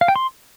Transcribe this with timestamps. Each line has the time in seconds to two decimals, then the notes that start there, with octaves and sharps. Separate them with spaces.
0.01 F5
0.08 G5
0.16 C6